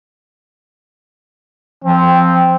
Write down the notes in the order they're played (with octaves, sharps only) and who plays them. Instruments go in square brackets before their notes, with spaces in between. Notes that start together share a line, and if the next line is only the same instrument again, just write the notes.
[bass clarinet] F3 [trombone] C4